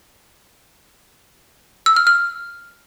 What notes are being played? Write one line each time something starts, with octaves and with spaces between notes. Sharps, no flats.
E6
F6
F6